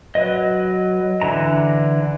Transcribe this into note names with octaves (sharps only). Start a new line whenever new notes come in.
F#3 B4 D#5
D3 E3 A#5